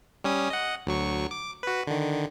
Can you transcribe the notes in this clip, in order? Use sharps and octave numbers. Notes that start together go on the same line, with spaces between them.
G3 C#4 D#6
D#5 F#5
D2 F#3 C#6
D6
F#4 B4
D3 D#3